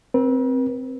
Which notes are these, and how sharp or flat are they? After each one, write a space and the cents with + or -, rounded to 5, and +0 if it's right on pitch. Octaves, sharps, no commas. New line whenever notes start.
C4 +0 B4 -45